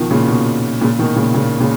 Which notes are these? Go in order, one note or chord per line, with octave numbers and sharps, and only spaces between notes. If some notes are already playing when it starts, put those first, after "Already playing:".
Already playing: B2 D#3 F3
A#2 C#3
B2
A#2 C#3
B2 D#3
A#2 C#3
A#2 C#3
A#2 C#3